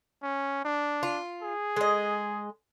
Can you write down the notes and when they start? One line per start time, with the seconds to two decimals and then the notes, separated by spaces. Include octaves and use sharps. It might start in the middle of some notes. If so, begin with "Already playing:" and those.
0.23 C#4
0.65 D4
1.03 F4
1.42 G#4
1.76 G#3 D#5